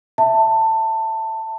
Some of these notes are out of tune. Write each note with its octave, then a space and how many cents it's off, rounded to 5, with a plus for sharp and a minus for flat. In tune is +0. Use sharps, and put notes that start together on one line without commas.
E5 +0 A5 +20